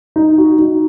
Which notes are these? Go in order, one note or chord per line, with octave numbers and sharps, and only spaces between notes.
D#4
F#4
D#4